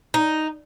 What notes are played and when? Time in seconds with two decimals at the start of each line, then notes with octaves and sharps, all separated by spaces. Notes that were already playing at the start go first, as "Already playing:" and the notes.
0.14 D#4